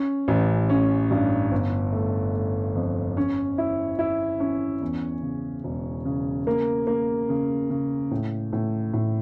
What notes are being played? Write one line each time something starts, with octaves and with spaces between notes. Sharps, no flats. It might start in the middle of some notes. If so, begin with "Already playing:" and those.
Already playing: C#4
A1
C#4
G2
G1
A3
A3
F2
C#4
E4
E4
C#4
E2
C#3
E1
C#3
A#3
A#3
C#3
C#3
A2
A2
A2